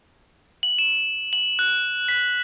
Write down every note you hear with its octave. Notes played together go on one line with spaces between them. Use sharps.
F#7
E7
F#7
F#6
B6